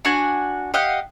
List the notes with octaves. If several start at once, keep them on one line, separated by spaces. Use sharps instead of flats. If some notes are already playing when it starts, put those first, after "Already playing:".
D4 F#4 G#5
G4 D#5 F5 F#5